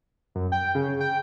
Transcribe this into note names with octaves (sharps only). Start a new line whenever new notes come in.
F#2
G5
C#3
G5